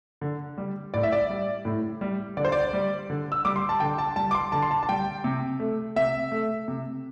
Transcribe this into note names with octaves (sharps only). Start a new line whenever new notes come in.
D3
G3
A2 D5
E5
D5
G3
A2
G3
D3 D5
C5
D5
G3
D3
E6
G3 D6
C6
A5
D3 G5
A5
G3 A5
D6
C6
D3 A5
C6
A5
A5
G3 G5
C3
A3
C3 E5
A3
C3